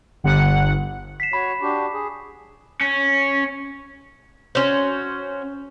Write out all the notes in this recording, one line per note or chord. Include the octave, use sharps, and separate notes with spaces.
G1 F#5
B6 C7 E7
F#4 C#5 B5
D4 F#4 G4
G#4
C#4
C#4 F#4 C5